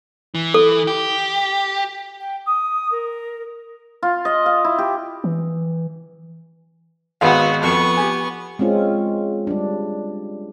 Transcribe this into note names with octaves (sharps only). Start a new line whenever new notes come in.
E3
A4
G4
G5
D#6
A#4
F4
D#5
F5
E4
G4
E3
G#1 B3 F#4 G#4 F5
F2 B3 C#6
G4 G#5
G#3 C4 C#4 F4
G3 D4